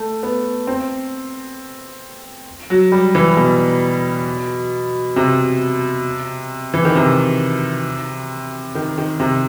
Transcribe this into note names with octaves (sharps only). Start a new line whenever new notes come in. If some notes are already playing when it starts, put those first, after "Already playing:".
Already playing: A3
B3
C4
F#3
G3
E3
B2
C3
E3
D#3
C3
D#3
D#3
C3